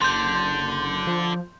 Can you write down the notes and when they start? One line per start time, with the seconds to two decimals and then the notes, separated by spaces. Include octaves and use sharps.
0.02 F#1 D3 C6 G6
1.07 F3